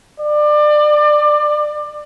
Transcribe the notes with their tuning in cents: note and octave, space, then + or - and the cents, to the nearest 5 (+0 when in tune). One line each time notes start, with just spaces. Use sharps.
D5 +25